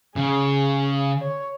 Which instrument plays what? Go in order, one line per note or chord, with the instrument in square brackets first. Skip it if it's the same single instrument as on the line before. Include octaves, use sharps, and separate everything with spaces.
[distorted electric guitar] C#3 [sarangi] G#4
[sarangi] C#5